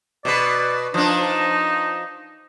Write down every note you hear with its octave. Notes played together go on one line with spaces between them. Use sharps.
B2 B4 D5
F3 D4 D#4